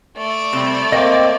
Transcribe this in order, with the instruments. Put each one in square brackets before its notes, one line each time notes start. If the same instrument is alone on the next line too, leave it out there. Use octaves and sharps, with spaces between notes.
[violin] A3 D5
[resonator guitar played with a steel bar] C3 G3
[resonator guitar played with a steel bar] A#3 [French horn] C4 [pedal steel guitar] D#5 G5 D6